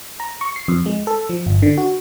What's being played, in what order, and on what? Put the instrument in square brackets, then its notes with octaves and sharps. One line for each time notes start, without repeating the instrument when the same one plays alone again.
[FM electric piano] A#5
C#6
C7
F2
G#3
A4
F3
G1
D3
F#4